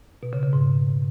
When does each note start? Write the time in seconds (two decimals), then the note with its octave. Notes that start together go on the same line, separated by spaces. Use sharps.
0.23 B2
0.33 C#3
0.43 C#3
0.53 G#2